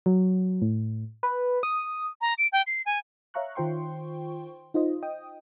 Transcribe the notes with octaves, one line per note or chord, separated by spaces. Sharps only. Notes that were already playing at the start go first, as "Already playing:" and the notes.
F#3
A2
B4
D#6
A#5
D7
G5
C7
G#5
C#5 E5 F5 A#5 C#6 F#6
D#3 F4 C5 G5 C6 C#6
D#4 F4 C5 D#5
D#5 G5 D#6